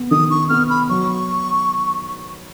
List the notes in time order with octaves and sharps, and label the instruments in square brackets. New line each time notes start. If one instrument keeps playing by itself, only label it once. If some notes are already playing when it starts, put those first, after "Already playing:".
Already playing: [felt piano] B3
[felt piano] D#3 [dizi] D#6
[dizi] C#6
[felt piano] B3 [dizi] F6
[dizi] B5
[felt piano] F#3 [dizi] C#6